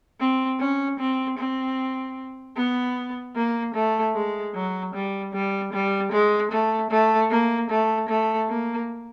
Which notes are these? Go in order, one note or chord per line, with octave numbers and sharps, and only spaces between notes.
C4
C#4
C4
C4
B3
A#3
A3
G#3
F#3
G3
G3
G3
G#3
A3
A3
A#3
A3
A3
A#3